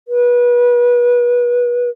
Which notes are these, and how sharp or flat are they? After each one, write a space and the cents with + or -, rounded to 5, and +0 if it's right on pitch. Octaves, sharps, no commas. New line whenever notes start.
B4 -30